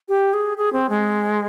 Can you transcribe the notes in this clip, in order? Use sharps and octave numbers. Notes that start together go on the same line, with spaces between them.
G4
G#4
G#4
C4
G#3